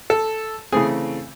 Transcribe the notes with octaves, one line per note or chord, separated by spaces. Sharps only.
A4
C#3 E3 A3 C4 G#4